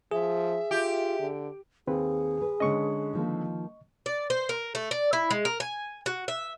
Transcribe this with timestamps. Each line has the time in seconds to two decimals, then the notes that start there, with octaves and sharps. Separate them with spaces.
0.11 F3 G#4 E5
0.71 F4 G4
1.20 D3
1.87 D#2 C4 G#4 B4
2.41 B4
2.60 D3 G#3 C#4 D#5 C#6
3.13 D#3 F3 A#3
4.06 D5
4.30 C5
4.49 A#4
4.75 A3
4.91 D5
5.13 E4
5.31 G#3
5.45 A#4
5.60 G#5
6.06 F#4
6.28 E5